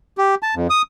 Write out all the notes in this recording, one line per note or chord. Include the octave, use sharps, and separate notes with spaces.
G4
A5
F2
D#6